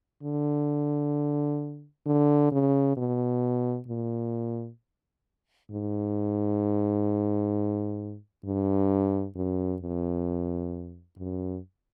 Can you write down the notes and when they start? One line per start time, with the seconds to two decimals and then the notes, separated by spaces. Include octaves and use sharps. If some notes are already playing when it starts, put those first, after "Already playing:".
0.23 D3
2.06 D3
2.52 C#3
2.97 B2
3.88 A#2
5.71 G#2
8.45 G2
9.36 F#2
9.82 F2
11.18 F#2